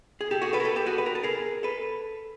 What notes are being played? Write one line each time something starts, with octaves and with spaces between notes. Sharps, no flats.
G#4
G4 A4
F#4 G#4
A4 B4
A#4
A4 B4
G4 A4
F#4 G#4
B4
A#4
A4
G#4 A#4
A4 B4